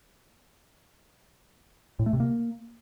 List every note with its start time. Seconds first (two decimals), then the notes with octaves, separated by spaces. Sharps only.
1.99 A2
2.06 A3
2.13 C3
2.20 A#3